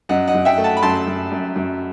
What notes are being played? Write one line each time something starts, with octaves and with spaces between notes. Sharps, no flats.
F#2 D#5 F#5
D#5 F#5
F#2
E5 G5
A3
F#5 A5
B5
F#2 A5 C6
F#2
F#2
F#2